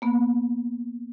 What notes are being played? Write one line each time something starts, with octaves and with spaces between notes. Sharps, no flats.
A#3 B3